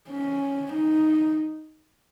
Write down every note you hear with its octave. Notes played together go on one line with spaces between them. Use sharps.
C#4
D#4